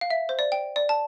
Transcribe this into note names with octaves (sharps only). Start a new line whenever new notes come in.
F5
E5
C5
D5
G5
D5
A5